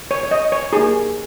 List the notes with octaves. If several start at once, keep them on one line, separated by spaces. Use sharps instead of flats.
C#5
C#5
D#5
C#5
A#3 D#4 G4 G#4